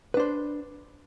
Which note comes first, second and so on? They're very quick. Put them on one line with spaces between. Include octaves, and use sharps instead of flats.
B4 D4 C5